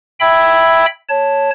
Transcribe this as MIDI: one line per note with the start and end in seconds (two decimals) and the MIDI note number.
0.20 0.86 76
0.20 0.86 79
0.20 0.86 83
0.20 0.86 88
0.20 0.86 92
1.09 1.51 73
1.09 1.51 81